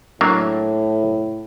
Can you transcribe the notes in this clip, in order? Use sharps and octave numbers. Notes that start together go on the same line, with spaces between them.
A2 F#3 A#3 D4